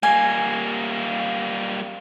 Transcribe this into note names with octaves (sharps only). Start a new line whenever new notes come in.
G3 A#3 G#5